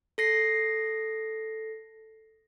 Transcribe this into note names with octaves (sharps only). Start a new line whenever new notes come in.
A4 A#6 C7